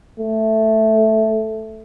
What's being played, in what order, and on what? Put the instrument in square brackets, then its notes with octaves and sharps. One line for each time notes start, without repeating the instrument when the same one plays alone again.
[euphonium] A3